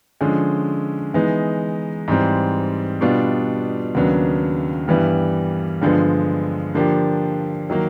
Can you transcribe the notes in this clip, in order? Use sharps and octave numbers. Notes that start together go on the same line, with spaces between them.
D3 F3 G#3 C#4
E3 G#3 B3 D#4
G#2 E3 G3 C4
B2 G3 B3 D4 F4
D#2 C#3 F#3 B3 D4
G2 E3 G3 B3
G2 D3 F3 G#3 B3
D3 F3 A#3 D4 G4
D#3 F#3 A#3